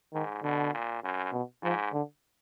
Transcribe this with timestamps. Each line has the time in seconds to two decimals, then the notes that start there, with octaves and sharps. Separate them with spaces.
0.13 G#2 D#3
0.43 B2 D3
0.74 A#2
1.03 F#2
1.33 B2
1.62 G#2 F3
1.92 D3